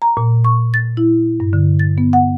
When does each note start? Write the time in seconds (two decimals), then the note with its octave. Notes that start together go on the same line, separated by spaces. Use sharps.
0.02 A#5
0.17 A#2
0.45 C#6
0.74 A6
0.97 E4
1.40 G2
1.53 D3
1.80 A6
1.98 B3
2.13 F#5